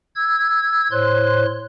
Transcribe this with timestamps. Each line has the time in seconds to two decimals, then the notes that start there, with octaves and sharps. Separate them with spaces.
0.16 E6 G#6
0.91 A2 C5 C#5 C6 F#6